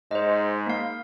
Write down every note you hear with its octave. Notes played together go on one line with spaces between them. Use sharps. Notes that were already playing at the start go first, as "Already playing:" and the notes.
G#2 C5 D#5
A#3 F5